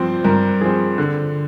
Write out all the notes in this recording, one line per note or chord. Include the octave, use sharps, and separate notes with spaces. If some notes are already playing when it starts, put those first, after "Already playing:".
Already playing: G2 F3 C4 C5
G2 A#4
F3 C4 G#4
D3